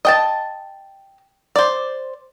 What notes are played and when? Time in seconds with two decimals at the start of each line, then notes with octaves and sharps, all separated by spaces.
0.05 D#5 G5 A5
1.56 C5 D5